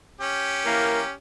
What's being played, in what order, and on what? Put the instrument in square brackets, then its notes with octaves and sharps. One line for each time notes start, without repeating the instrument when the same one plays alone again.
[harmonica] C#4 G4
[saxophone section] E3 A#3